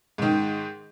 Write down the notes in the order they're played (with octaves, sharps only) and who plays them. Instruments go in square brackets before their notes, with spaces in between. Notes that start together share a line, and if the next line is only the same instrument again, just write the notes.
[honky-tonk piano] G#2 D#3